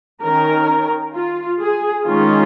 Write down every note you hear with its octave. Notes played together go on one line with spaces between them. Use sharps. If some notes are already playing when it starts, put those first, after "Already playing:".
D#3 C#4 A#4
F4
G#4
D#3 G#3 C#4 F4